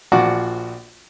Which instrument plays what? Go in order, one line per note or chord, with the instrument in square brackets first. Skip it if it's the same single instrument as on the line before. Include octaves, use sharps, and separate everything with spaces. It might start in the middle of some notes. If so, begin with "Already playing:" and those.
[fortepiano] A#1 F3 F#4 D5 F#5 D6